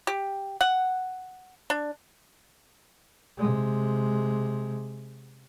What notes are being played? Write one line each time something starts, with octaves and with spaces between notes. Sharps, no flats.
G4
F#5
D4
C3 G#3